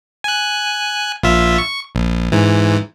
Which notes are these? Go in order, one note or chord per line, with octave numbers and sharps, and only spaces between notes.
G#5 F#6
A#1 F4 E5
C#6
A#1
G#2 E3